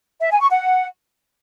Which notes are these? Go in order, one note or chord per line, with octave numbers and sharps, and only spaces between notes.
E5
G#5
C#6
F#5